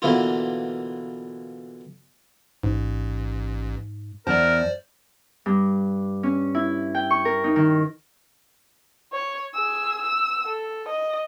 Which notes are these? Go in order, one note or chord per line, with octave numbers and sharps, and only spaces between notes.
B2 D3 E3 A#3 E4 F4
A1 G#2
E2 A#4 C5 D5 A5
G2
C#4
E4
G5
C#6
A#4
D#4
D#3
C#5
G#4 E6
E6
A4
D#5